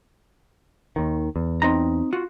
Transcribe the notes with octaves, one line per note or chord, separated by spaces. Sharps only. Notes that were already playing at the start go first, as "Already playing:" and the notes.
D#2 D#3
E2
C4 D#4 A#5
F4 F#4